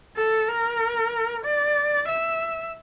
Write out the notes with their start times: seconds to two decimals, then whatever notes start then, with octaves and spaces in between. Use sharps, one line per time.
0.16 A4
0.48 A#4
1.45 D5
2.08 E5